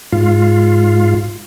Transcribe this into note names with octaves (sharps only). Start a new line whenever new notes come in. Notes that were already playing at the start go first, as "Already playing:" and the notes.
G#2 F4